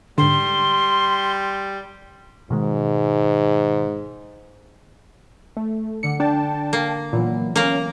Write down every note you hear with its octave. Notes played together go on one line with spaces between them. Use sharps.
G#2 D3 G3 C6
G#2 B2 D#3 G#3
A3
D3 F#5 D6 C#7
D4 G5 A5 F6
A#3
A#2 E3 F#3 B3
A#3 C#4 A#4